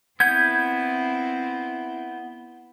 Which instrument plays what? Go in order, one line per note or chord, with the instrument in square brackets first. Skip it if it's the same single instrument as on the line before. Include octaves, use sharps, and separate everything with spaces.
[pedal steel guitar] B3 G6 [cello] C4 E4 [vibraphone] F#5 [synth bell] G#6